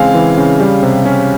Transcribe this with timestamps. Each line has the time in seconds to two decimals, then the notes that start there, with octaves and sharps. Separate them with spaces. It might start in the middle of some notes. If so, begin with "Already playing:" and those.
Already playing: C#3 E3 G#3 C4 F5 G#5
0.14 E3
0.38 C#3
0.60 G3
0.83 C3
1.05 C#4